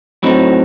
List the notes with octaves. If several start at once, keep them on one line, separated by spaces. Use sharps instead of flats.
A2 F#3 C4 D#4